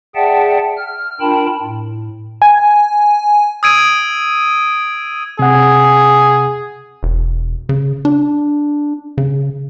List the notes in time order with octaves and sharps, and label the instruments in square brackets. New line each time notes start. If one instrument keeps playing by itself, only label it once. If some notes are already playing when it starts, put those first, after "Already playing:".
[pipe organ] G#4 D5 E5 F#5 G5 A5
F6
D4 F4 A#4 G5 A5 B5
A2
[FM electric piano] G#5
[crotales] D#6 E6 G#6 D7 D#7
[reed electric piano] C3 F#5 [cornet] G#4
[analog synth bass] E1
C#3
D4
C#3